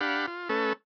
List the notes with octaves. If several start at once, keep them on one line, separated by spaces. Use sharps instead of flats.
D4 G4 F5 F#5 B5
F4
A3 C#4 A4 B4